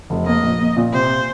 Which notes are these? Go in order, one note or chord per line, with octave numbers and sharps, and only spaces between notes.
F1
A#3 D#5
A#1
A#3
A#2
C3 C5